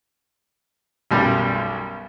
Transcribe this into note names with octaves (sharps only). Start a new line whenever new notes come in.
B1 F#2 G3